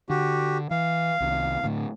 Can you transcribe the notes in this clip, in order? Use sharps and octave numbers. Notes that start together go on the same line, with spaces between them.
D3 F#4 G4
E3 F5
C2 C3 D#3
A2 D3